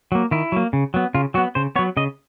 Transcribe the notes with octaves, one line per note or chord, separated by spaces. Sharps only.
F#3 A#3
D#3 E4
F#3 A#3
C#3
F#3 B3
C#3 F4
F#3 B3 F#4
C#3 C5
F#3 B3 C#5
C#3 D#5